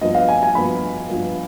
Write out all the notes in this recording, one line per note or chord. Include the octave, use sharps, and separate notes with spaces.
G2 F3 B3 D#5
F5
G#5
G#5
G2 F3 B3 B5
G2 F3 B3